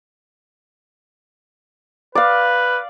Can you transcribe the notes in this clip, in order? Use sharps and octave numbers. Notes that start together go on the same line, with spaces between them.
B4 D5 F5